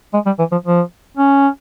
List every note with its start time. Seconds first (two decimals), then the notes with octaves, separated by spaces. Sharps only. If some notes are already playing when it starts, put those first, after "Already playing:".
0.14 G#3
0.26 G3
0.39 E3
0.52 F3
0.66 F3
1.17 C#4